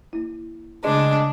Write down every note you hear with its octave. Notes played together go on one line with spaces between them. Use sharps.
A#3 E4
C#3 G#3 A3 D4